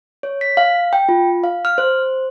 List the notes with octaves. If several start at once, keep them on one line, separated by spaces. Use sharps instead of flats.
C#5
B6
F5
G5
F4
F5
F6
C5